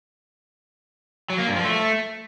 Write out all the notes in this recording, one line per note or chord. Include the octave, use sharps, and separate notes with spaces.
F#3
A#3
G2
F3
A3